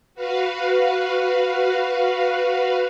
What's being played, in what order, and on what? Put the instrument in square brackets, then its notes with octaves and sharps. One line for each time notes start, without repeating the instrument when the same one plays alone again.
[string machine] F#4 B4 F5